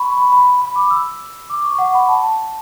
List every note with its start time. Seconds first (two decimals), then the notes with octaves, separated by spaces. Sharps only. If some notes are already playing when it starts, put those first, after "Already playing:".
Already playing: B5 C#6
0.17 B5
0.32 B5
0.62 B5
0.76 D6
0.91 E6
1.50 D6
1.64 C#6
1.78 F#5
1.94 B5
2.08 A5